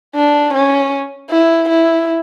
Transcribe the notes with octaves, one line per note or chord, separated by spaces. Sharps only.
D4
C#4
E4
E4